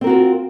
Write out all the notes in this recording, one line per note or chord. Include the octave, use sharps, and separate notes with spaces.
C4 F4 F#4 A#4